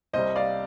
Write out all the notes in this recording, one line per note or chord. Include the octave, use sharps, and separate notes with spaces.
C2 C3 G3 C5 D#5
D5 F5